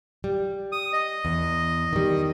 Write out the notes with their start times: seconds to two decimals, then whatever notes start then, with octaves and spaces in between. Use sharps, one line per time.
0.24 G3
0.72 D#6
0.93 D#5
1.25 E2
1.93 D#3 G3